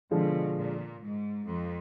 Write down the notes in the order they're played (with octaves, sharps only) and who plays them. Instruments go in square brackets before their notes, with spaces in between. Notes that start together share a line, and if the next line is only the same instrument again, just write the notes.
[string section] B2 [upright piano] D3 F3 G#3
[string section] A#2
G#2
F2